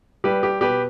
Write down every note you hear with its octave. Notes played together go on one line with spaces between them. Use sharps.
G3 G4 B4
G4
B2 G4 B4